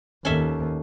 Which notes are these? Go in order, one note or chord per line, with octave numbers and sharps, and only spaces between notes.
D#2 C#4 A4 E5